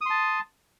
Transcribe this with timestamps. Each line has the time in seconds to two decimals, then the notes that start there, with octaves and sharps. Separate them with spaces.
0.01 D#6
0.06 C6
0.10 A5